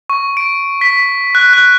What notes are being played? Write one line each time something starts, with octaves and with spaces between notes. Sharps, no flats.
C#6
D7
B6
F#6
F#6